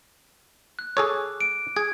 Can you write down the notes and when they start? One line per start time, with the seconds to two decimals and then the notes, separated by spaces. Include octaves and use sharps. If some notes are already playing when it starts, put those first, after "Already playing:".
0.79 F#6
0.97 G#4 A4 C#5 D6
1.41 D7
1.76 G#4 G#6